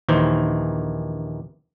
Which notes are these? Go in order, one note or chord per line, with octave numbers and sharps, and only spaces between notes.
A#1 D#2 D#3 E3 C5